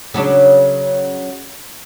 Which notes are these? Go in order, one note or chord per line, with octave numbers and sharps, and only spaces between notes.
C#3 F#3 D4